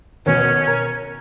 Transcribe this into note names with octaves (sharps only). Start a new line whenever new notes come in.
D#2 B2 C#4
A#4